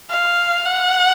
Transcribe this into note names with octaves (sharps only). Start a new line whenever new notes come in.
F5
F#5